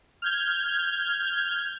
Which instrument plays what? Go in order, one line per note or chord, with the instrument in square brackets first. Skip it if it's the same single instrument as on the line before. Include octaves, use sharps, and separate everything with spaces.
[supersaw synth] F6 G6 G#6